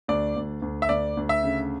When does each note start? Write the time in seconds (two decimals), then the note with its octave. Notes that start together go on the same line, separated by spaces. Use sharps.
0.08 D2 D5
0.36 D2
0.62 D2
0.82 E5
0.89 D2 D5
1.17 D2
1.29 E5
1.43 C#3